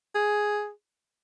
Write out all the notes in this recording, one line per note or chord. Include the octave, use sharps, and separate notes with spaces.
G#4